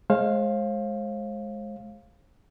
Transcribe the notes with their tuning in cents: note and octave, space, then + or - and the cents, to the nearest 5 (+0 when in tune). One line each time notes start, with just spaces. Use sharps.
G#3 +15 C5 +45 F5 +0